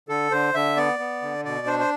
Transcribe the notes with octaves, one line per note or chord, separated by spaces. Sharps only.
D3 A4
D3 C5
D3 E5
B3 D5
B3
D3
B2 D5
D4 C5
C5